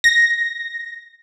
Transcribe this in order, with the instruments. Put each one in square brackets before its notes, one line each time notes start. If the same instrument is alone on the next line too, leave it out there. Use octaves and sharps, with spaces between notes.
[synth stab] A#6